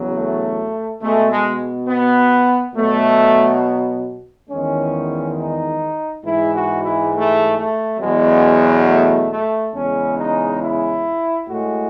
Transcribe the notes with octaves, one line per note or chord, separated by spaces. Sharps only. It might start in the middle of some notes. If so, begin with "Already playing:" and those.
Already playing: E2 C#3 F#3
A3
B2 G#3 A3
G#3
B3
B2 F#3 A3
E2 D#3 G#3 C#4
D#4
G#2 E3 G#3 E4
F#4
E4
A3
A3
E2 B2 F#3 G#3
A3
A3
E2 C#3 G#3 C#4
D#4
E4
A2 G#3 F#4